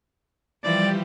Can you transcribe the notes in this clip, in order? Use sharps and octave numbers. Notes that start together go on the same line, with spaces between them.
E3 F3 G3 G4 D5